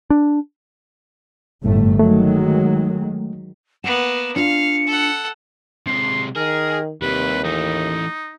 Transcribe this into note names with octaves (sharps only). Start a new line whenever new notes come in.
D4
G1 F#2 A2 A3
D#3 F#3 G#3 A3
A#3 B3 F#5 E7
D4 F4 F5 C#7
A4 F#5
C3 G#3 C6
D#3 G#4 A#4
D#2 C3 G3 B4
E3 A3 D#4